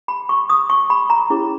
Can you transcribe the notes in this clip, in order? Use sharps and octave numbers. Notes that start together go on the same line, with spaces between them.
B5
C#6
D#6
C#6
B5
A#5
C#4 E4 G#4 C#5